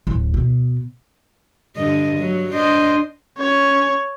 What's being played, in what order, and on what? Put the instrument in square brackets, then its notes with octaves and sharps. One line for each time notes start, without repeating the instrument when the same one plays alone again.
[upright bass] D1
B2
[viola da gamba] G2 D3 D#5
F#3
D4 C5 D#5
[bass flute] C#4 [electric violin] C#5